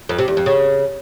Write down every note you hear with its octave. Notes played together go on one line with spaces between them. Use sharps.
F2
C3
E2
F2
C#3